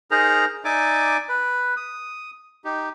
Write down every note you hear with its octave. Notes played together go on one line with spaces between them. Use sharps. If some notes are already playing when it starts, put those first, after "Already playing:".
D#4 G#4 A#4 C5 A#5
D#4 D5 E5 G#5 D6
B4
D#6
D#4 G4